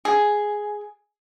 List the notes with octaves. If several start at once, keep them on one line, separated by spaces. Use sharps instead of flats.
G#4